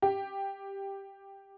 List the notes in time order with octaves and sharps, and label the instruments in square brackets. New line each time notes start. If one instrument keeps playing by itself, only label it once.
[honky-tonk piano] G4